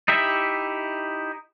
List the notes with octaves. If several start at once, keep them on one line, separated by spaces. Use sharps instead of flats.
D#4 E4 G4 E5